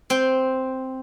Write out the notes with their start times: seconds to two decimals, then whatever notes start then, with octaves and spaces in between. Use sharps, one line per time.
0.10 C4 G5